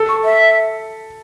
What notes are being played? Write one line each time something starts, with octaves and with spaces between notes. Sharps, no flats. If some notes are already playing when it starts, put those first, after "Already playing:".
Already playing: A4
C#6
E5